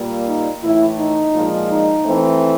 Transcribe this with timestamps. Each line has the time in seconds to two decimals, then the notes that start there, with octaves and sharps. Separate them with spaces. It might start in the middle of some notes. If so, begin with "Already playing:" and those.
Already playing: A#2 G3 A#3
0.27 D#4
0.62 A2 E3 A3 E4
0.98 D#4
1.33 A#2 F3 G#3
1.69 D#4
2.05 E3 A3 C4